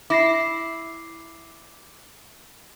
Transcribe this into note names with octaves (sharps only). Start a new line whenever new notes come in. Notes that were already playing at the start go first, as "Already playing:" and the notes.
E4 D6 A#6 C7